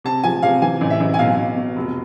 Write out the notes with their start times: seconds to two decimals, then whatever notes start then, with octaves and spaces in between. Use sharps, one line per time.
0.04 C3 A5
0.24 F3 G#5
0.43 C3 F5
0.62 E3 G#5
0.81 A1
0.90 E5
1.00 A1
1.14 G#5
1.19 B1 F5
1.38 B1
1.57 B2
1.76 F1